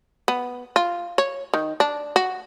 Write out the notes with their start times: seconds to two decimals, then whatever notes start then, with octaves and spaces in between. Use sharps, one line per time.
0.28 B3
0.76 F4
1.18 C#5
1.54 D#3
1.80 D4
2.16 F#4